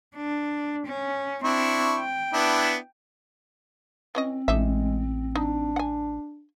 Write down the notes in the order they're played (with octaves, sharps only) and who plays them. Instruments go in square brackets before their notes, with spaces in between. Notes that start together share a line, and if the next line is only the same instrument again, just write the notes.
[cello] D4
C#4
[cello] C4 [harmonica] D4 E4 C#6
[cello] G5
[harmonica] B3 D4 E4
[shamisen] E3 C#4 D#5 [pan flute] C4
[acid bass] A1 [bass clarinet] G#3 [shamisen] D4 D#4 E5
[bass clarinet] D4 [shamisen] D#4
[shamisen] F#5 G#5